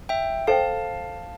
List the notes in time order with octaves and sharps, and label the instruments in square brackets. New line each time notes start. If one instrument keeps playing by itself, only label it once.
[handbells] E5 G5
[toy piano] A4 C5 G5 [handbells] F5 A5